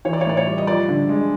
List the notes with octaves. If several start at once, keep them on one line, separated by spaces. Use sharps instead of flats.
E3 C#5
D5
C#5
A2 D5
C#5
G3
D#5
F3 D5
D3
G#3